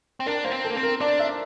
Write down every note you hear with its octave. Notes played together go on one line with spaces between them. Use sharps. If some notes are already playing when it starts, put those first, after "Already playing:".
C4
D4 A#4
A#3 C5
C4
A4
A#3
C4
A#4
D4 D5
E5